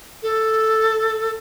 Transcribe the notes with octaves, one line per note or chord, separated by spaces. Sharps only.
A4